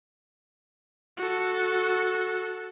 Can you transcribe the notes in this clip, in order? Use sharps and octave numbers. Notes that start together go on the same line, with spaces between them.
F#4 A4